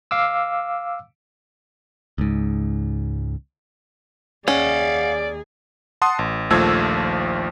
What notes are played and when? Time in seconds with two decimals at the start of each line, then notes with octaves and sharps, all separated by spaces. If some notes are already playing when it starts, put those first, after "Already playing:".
0.11 F5 D6 E6
2.18 C#2 G#2
4.48 D#2 C#4 G#4 D5 F5 F#5
6.02 F#5 A5 C6 D#6
6.19 A1
6.50 A#1 D#2 F3 A3 E6 G#6